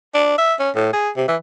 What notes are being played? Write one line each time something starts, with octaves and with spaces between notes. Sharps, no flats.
D4
E5
C#4
A2
G#4
C3
E3